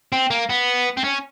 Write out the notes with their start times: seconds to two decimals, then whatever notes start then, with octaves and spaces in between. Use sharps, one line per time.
0.12 C4
0.31 A#3
0.50 B3
0.97 C4
1.04 C#4